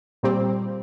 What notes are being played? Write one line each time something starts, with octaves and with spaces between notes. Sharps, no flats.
A#2 G3 C4